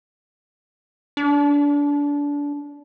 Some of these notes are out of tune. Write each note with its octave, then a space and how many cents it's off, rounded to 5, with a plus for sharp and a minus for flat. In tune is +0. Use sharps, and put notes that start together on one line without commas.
D4 -25